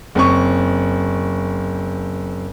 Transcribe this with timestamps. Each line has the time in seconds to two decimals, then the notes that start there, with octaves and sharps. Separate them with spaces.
0.15 F#1 C4 C#6